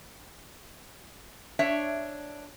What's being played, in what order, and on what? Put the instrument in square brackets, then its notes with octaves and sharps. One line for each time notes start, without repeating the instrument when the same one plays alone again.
[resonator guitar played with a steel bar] D4 C#5 E5